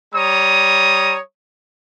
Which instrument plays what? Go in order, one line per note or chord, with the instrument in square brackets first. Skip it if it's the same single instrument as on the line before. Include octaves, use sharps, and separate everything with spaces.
[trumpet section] G3 C#5 A#5 D#6